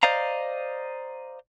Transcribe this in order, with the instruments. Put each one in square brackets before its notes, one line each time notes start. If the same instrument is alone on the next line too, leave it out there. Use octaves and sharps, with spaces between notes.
[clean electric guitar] C5 D5 D#5 F5 A#5